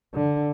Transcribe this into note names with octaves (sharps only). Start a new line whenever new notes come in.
D3